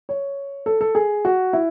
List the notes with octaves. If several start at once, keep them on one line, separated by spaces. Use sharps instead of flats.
C#5
A4
A4
G#4
F#4
E4